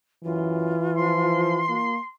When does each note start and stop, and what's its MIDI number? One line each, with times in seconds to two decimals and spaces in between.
0.24 0.76 42
0.24 1.83 52
0.24 1.87 65
0.98 1.59 53
0.98 2.10 84
1.69 1.97 58